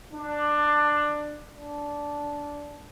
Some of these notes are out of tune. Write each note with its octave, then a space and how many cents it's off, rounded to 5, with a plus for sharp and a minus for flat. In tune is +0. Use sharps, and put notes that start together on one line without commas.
D4 +15
D4 -10